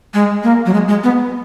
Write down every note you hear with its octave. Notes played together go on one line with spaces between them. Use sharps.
G#3
A#3
F#3
G#3
G#3
B3